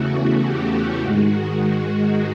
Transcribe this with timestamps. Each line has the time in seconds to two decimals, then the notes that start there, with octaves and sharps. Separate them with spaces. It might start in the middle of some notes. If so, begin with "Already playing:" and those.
Already playing: E2 C#3 E3 A3 F#4
0.45 G4
1.02 G#2 D#3 G#3 F#4